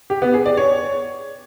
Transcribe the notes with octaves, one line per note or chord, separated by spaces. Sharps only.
G4
B3
G#4
D5
C#5